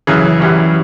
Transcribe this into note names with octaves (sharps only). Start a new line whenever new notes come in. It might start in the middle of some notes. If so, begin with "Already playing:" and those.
F#2 C#3 E3
F#2 E3 G3 C#4